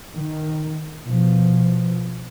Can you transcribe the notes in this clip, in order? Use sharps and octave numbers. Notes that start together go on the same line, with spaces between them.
D#3
B2 F3